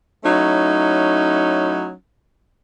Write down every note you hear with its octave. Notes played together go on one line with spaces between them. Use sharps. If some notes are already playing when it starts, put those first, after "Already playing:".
F#3 A3 C#4 D#4 E4